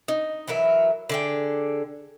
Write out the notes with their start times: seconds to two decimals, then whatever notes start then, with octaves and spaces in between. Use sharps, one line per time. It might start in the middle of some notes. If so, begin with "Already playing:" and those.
0.08 D#4
0.48 E3 F#3 A#4 E5
1.09 D3 G#4 G5